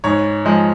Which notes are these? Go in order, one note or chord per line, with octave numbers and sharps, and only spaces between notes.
G#2 C#5
F3 G#3